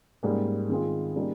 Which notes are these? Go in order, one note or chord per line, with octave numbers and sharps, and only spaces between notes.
G#2 G3 A#3 C#4 G#4
D#3 G#3 C4 F4 G#4
C#3 G3 A#3 D#4 G#4